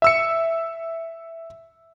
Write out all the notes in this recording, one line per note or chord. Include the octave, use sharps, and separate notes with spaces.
E5 E6 C#7